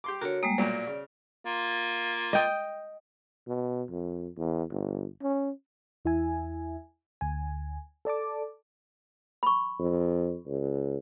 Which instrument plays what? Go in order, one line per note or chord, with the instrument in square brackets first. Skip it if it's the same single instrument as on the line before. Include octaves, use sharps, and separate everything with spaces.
[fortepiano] G4 C6 D6
[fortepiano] D3 A#4 [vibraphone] F#4 C#5
[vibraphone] G3 G#3 A#3 [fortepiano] D#6
[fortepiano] B1 A#2 F#3 [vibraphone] D5
[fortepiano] C#3
[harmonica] A#3 F4
[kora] D#5 G5
[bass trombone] B2
F2
E2
G1
C#4
[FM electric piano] E2 E4 E5 G#5
D2 G#5
A4 D5 A5 D6
[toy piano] B5 C#6
[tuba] F2
C#2